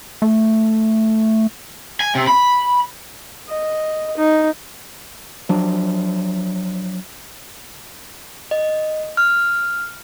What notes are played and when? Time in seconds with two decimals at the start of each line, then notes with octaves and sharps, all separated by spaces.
0.22 A3
2.00 G#5
2.15 C3
2.27 B5
3.48 D#5
4.17 D#4
5.49 F3 F#3 D4
8.51 D#5
9.17 F6